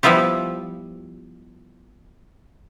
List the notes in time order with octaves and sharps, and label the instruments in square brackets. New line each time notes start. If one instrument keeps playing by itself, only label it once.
[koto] F3 G3 B3 E4 F4 G4